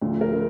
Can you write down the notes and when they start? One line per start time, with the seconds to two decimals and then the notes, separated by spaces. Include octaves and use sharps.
0.02 D2 D3 F3
0.21 A#4